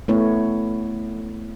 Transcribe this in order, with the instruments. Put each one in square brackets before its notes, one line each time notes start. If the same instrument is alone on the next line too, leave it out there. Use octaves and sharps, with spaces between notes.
[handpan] A3 B3 E4 C#5